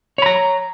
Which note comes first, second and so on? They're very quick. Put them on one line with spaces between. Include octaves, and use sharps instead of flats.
C#5 B5 A#5